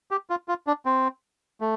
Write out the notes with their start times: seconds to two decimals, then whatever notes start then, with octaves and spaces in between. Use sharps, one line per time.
0.11 G4
0.30 F4
0.48 F4
0.67 D4
0.86 C4
1.61 A3